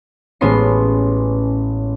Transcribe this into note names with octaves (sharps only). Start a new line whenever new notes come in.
A1 G#3 B3 C#4 C6 C7